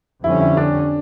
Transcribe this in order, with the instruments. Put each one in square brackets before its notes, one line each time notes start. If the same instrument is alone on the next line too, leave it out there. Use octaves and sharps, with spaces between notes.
[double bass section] F2 D3 G3 C#4 [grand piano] E4
[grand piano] E4
D4